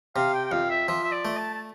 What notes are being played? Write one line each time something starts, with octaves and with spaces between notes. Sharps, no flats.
C3 F5
G5
G5
F2 F5
E5
F3 E5
E5
D5
A3
A5
A5